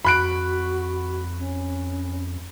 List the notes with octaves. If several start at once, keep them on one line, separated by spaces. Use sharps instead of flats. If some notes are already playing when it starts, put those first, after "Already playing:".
F2 F#4 B5 F#6 D7
C#4